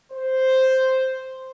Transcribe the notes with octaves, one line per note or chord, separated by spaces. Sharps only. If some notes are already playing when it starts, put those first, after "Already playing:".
C5